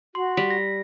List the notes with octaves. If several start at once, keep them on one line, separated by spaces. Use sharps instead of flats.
F#4 C6
G3 B6
A#6